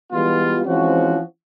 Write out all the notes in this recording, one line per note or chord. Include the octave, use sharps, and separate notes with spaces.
E3 G3 G#3 B3 F4
E3 F3 G#3 C4 C#4 F#4